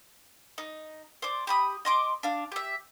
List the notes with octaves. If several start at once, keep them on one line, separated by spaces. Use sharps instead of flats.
D#4
C5 D5
G4 B5 D#6
D#5 C6 D6
D4 F5
G4 E5